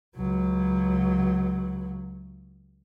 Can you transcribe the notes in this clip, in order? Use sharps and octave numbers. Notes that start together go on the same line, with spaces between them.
C#2 F#3